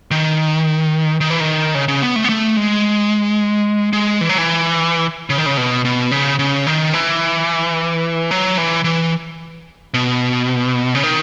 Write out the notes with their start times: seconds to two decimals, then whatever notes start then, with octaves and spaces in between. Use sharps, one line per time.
0.11 D#3
1.21 D#3
1.30 E3
1.40 D#3
1.75 C#3
1.88 C#3
2.02 B3
2.16 A3
2.24 B3
2.29 A3
2.57 G#3
3.93 G#3
4.21 E3
4.29 F#3
4.38 E3
5.30 C#3
5.38 D#3
5.46 C#3
5.57 B2
5.85 B2
6.11 C#3
6.39 C#3
6.67 D#3
6.93 E3
8.31 F#3
8.58 E3
8.84 E3
9.94 B2
10.95 C#3
11.03 D#3